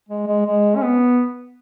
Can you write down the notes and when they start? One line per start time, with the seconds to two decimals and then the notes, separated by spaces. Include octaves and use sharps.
0.09 G#3
0.27 G#3
0.45 G#3
0.76 C#4
0.82 B3